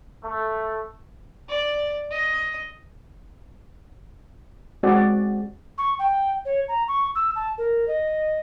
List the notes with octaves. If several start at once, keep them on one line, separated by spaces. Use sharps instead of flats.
A3
D5
D#5
G#3 C4 F#4 G#4 D5 F#5
C#6
G5
C#5
A#5
C#6
E6
A5
A#4
D#5